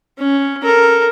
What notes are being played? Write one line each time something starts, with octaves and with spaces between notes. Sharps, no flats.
C#4
A4 A#4